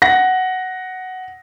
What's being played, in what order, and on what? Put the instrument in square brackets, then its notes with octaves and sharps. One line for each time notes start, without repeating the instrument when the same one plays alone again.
[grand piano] F#5 A#6